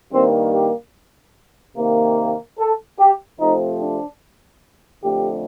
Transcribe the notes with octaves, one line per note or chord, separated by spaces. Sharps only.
G2 D#3 A#3 C4
G4
C3 D#3 A#3
A4
G4
C3 F3 A3 C4 D#4
D4
F2 D3 A3 G4